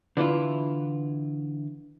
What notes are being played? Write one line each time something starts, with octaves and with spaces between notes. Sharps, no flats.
D3 E3 E4 F4